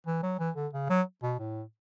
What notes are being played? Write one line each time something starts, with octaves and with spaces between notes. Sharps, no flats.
E3
F#3
E3
D3
C#3
F#3
B2
A2